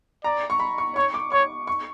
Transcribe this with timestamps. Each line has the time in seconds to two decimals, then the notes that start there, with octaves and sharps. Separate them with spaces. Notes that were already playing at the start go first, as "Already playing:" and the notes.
0.24 D5 A#5
0.50 C#6
0.60 B5
0.78 C#6
0.95 C#5 C#6
1.14 D6
1.32 C#5 C#6
1.67 C#6